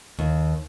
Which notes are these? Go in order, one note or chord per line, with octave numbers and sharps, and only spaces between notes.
D#2